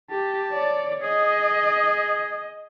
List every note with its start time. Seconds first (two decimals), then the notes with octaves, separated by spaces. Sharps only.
0.11 G4 A5
0.51 C#5 D5
1.03 G#4 D#5